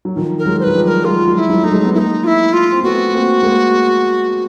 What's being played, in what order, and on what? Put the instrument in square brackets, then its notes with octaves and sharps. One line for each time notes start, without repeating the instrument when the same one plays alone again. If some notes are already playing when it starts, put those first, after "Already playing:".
[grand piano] F#3
D#3 F3
[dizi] A#4
[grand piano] F#3 G#3
[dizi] C5
[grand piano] F#3 [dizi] B4
[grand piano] F3 G3
[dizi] B4
A#4
[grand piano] F#3 G#3 [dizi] F4
[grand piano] F#3 G#3
[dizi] F4
E4
[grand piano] F#3 G#3
[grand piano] A3 [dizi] D#4
[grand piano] F#3 G#3
B3
[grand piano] G#3 A#3 [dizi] D#4 E4
[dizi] F4
E4
F4
[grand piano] C4
[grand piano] A3 B3 [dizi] F#4
[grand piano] A#3 C4
G#3 A#3